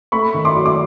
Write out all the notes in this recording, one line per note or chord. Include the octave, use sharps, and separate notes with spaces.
A3 B5 C#6
D#3
C6 D6
F#3
D6